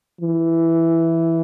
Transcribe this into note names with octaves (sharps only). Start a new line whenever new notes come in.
E3